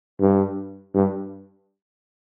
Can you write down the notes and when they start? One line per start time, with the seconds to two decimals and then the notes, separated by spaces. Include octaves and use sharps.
0.20 G2
0.94 G2